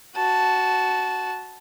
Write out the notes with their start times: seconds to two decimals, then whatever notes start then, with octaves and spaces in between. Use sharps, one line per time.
0.16 F#4 A5